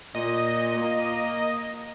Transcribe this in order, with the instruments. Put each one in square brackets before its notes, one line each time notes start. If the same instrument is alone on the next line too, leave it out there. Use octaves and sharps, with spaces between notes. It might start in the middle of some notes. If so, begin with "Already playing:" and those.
[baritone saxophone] A#2 [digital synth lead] D#5
[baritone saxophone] A#3